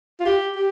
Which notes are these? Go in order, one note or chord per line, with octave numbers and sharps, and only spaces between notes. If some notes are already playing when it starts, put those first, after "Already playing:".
F4
G4
G4